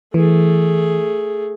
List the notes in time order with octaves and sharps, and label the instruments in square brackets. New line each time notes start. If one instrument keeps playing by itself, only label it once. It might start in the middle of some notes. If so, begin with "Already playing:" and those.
[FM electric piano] E3 [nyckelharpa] A3 G#4